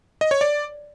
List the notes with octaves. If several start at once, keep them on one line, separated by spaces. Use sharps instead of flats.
D#5
C#5
D5